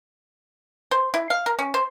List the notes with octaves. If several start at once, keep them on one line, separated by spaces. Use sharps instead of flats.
C5
E4
F5
A#4
C#4
C5